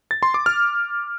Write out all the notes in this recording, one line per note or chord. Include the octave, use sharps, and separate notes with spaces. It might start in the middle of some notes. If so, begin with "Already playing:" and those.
A6
C6
D6
F6